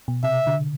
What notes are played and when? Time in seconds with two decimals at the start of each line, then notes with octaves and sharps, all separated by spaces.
0.08 B2
0.23 C3 E5
0.47 D3